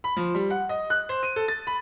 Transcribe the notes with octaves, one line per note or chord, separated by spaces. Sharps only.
B5
F3
G3
F#5
D#5
F#6
C5
D#7
A4
A6
B5